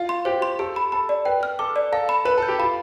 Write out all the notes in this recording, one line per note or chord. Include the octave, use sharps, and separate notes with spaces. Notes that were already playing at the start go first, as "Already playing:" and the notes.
Already playing: F4
C6
G4 C5
C6
G4 A4
B5
A4 B5
D5
B4 G5
F6
A4 D6
D5
A4 F5
B5
B4 B5
A4 G6
G4
F4 B5